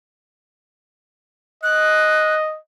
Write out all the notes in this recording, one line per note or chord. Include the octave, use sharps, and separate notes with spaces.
D#5 F#6